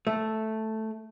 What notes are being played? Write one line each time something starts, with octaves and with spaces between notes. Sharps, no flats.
A3